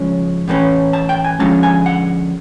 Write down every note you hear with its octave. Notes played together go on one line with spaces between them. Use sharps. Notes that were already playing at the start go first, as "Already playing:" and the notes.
Already playing: C#3 F3 G#3 C#4
A2 E3 A3 C#4
A5
G5
G#5
D3 F3 G#3 C#4 A5
G#5
F#5